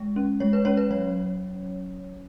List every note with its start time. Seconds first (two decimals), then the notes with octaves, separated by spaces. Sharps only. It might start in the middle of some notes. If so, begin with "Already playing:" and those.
Already playing: G#3
0.16 C#4
0.40 G#3 C#5
0.53 B4
0.65 C#4 C#5
0.77 B4
0.91 F#3 C#5